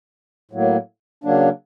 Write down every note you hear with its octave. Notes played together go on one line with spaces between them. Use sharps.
A2 F#3 A#3
C#3 F#3 A#3 D4